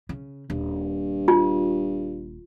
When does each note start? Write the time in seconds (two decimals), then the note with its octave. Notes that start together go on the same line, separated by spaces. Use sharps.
0.09 C#3
0.50 D#1 G2
1.28 F4